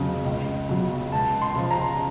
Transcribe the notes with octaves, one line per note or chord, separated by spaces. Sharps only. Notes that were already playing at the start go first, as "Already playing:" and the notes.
Already playing: F2 C#3 F#3
C#2
C#3 F#3
C#2 A5
C6
C#3 F3
A#5